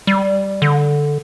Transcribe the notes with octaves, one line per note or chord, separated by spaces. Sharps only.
G3
D3